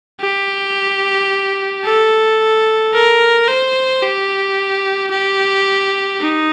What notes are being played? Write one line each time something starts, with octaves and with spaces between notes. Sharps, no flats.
G4
A4
A#4
C5
G4
G4
D#4